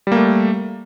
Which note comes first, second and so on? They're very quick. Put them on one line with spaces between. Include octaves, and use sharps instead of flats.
G3 A#3 A3